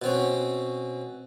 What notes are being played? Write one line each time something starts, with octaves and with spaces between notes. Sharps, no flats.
B2 C4 C#4